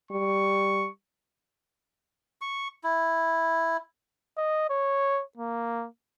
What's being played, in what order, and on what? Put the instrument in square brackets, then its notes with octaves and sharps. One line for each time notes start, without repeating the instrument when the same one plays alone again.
[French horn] G3 [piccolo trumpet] C#6
[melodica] C#6
E4
[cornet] D#5
C#5
A#3